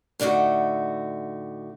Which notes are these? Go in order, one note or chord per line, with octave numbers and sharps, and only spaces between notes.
A2 D3 D#4 F#4 E5